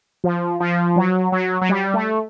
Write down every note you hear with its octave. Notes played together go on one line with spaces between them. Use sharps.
F3
F3
F#3
F#3
F#3
G3
A3